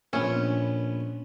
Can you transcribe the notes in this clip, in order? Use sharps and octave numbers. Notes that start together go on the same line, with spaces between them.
A#1 B3 C#4